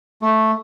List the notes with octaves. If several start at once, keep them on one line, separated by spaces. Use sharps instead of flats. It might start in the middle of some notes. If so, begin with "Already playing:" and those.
A3